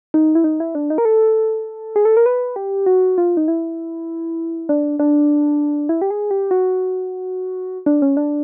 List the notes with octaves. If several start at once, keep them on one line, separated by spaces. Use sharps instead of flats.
D#4
E4
D#4
E4
D4
D#4
A#4
A4
G#4
A4
A#4
B4
G4
F#4
F4
D#4
E4
D4
D4
E4
G4
G#4
G4
F#4
D4
C#4
D4